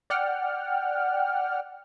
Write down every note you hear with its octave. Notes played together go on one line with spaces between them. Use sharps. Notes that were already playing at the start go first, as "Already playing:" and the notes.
D5 F#5 G5 F6